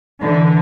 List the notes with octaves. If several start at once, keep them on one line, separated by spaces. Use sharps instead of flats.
D3 E3